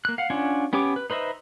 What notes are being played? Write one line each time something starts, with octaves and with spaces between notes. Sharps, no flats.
A#3 F#6
F5 F#5
C#4 D4 F4 F#5 G#5
B3 C#4 G4 C#5 D6
B4
D#4 B4 C5 D#5 E5